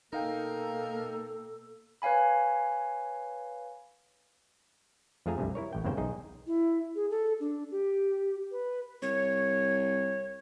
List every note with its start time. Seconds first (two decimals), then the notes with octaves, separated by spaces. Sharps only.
0.13 B2 A#3 D#4 A4 A#4 F5 G5
2.02 B4 C#5 F5 G#5 B5
5.26 F2 F3 A3 G#4 G#5 A#5
5.38 C2 G2 C3
5.55 E4 A#4 C#5
5.73 A1 G5
5.84 E2 G2 C#3 A#3 C5 G5
5.97 B1 D#4 G#4 D#5
6.47 E4
6.95 G#4
7.11 A4
7.40 D4
7.71 G4
8.52 B4
9.02 C2 C#5